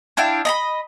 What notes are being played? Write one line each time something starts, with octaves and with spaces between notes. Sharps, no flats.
D4 E4 F5 G5
D#5 A#5 B5